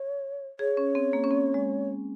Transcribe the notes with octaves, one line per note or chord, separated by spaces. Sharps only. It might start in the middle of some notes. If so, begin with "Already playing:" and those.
Already playing: C#5
G#4 C#5
C#4
C4
A#3
C#4
C4
G#3